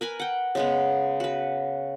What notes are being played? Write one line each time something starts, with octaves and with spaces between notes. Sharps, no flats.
A#4 B4 G#5
F#5 G5
C#3 G#3 B3
F#4 B4